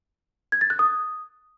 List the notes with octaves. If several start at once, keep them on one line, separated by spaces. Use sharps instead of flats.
G#6
A6
F#6
D#6